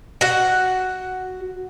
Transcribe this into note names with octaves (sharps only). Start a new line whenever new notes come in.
F#4 F#5